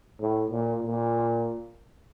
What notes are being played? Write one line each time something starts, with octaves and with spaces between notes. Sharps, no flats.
A2
A#2
A#2